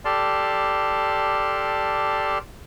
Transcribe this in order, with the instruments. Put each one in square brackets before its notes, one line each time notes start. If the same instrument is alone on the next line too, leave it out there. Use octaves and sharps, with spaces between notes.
[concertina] G4 A4 D5 A5 C6 F6